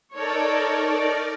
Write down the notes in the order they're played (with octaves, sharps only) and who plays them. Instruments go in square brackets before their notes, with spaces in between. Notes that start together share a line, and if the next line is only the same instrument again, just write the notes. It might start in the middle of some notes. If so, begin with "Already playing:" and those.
[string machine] D#4 A#4 D5 [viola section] A4 C#5